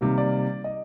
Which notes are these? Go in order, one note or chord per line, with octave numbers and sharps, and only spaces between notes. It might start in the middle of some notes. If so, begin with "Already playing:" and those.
C3 D#3 G3 A#3
D5
D#5